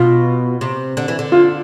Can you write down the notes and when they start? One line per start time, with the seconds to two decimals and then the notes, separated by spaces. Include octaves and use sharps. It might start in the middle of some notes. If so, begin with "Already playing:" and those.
Already playing: B2 F4
0.61 C3
0.97 D3
1.08 E3
1.19 D3
1.32 F4